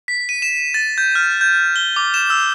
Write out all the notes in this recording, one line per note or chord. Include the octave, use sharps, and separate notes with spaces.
B6
D#7
E7
A6
G6
F6
G6
G7
D6
E7
E6